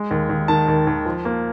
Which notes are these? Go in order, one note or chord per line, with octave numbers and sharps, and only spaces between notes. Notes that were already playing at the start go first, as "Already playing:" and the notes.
Already playing: G#3
D#2
D#2
D#3 A5
D#2
D#2
F3
A#3